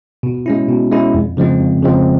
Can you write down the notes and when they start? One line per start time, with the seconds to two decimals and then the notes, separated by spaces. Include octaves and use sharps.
0.23 B2
0.46 G#3 C#4 E4
0.68 B2
0.91 G#3 C#4 E4
1.14 F2
1.37 C#3 F3 G#3 C4
1.60 F2
1.82 C#3 F3 G#3 C4